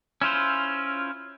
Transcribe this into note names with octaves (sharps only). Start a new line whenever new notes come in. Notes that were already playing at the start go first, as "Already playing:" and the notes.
C#4 E4 F4 C5